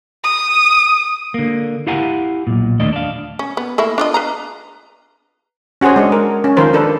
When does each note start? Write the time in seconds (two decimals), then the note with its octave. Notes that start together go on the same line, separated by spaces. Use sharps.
0.24 D#6
1.34 D3 A#3
1.87 E4 G4 F5 F#5 G#5 A#5
2.47 B1 A#2
2.79 D#2 D3 A3 D4 D#5
2.93 D4 F5
3.39 C#4
3.57 B3
3.78 A3 A#3 E4
3.98 D4 F4 D#5
4.14 B4 F5 A#5
5.81 C#4 F#4 G#4 C5 C#5
5.96 G#3 D4
6.12 A#4
6.44 C#4
6.57 D#3 F3 A#4 C5
6.73 D4 A4 B4